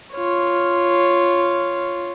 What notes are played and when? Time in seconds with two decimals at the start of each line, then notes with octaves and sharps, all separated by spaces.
0.13 F4 C#5